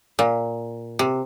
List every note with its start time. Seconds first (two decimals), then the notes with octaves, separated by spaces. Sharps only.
0.19 A#2
0.99 C3